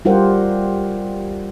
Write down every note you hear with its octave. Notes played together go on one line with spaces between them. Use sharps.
G3 F4 G4 A#4 C5 F#5